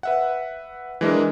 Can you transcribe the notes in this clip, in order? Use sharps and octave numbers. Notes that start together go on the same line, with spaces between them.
B4 E5 F#5
E3 G#3 D4 A#4